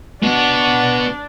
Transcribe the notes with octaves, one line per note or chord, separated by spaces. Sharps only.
B3 D4 F#4